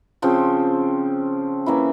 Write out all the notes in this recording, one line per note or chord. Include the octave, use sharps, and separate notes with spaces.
C#3 F3 C4
E3 A#3 C#4 E4